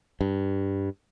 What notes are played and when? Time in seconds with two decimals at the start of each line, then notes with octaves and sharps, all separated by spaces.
0.21 G2